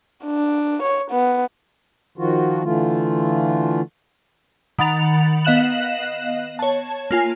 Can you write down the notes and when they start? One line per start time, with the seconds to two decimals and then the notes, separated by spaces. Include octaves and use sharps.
0.24 D4
0.83 C#5
1.11 B3
2.18 D#3 F3 F4 F#4
2.64 D3 E3 A3 F4
4.79 D#3 F#5 B5 A6 F7
5.45 B3 D#5 F5 F#6 E7 F#7
6.59 C#5 A5
7.11 A#3 F4 G#5